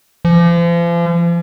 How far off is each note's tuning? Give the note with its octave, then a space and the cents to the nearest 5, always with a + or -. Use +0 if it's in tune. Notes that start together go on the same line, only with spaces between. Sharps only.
F3 -40